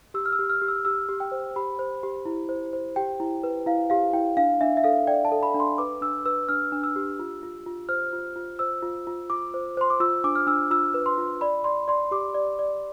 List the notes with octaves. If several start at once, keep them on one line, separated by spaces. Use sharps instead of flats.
G4 E6
F6
E6
G4
F6
G4
E6
G4 E6
G4
G5
C5
G4 B5
C5
G4
E4
C5
C5
G4 G5
E4
B4
E4 F5
G4 F5
E4 G5
D4 F5
D4 E5
E5
A4 F5
D5 G5
A5
A4
B5
D4
C6
B4 D6
D4 E6
B4 E6
D4 F6
D4
E6
G4
F4
F4
F4
C5 F6
F4
F4
C5 E6
F4
F4
F4 D6
C5
C5 C6
D6
F4 E6
D4 D6
F6
D4 E6
F4 E6
B4
C6
F4
D5 B5
D5 C6
D5 C6
G4 D6
D5
D5